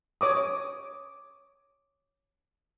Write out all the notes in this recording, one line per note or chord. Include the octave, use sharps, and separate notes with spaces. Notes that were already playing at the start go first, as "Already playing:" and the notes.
C#5 D6 D#6